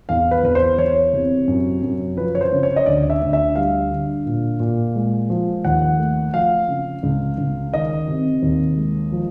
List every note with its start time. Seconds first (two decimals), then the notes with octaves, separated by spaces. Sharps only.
0.09 E2 F5
0.31 B4
0.43 E2 B4
0.55 C5
0.78 E3 C#5
1.13 C3
1.48 F#2
1.82 F#2
2.17 F3 B4
2.35 C#5
2.41 C5
2.52 C#3
2.63 C#5
2.76 D#5
2.86 D2 D5
3.10 E5
3.22 D2
3.33 E5
3.56 G3 F5
3.91 D3
4.26 A#2
4.60 A#2
4.96 G#3
5.30 F3
5.65 D#2 F#5
5.99 A3
6.34 F3 F5
6.69 C#3
7.03 C#2
7.38 C#2
7.73 D#3 D#5
8.08 C3
8.42 D#2
8.77 G#3
9.12 F3